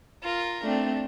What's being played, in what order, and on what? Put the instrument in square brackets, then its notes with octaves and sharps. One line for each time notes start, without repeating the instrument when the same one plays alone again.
[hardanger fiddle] F4 A#4
[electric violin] A3 C4 [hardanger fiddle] D4